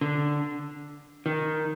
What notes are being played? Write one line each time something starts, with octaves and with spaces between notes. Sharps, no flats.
D3
D#3